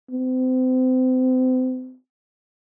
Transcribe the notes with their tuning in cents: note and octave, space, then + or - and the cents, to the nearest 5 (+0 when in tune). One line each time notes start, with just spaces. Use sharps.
C4 -35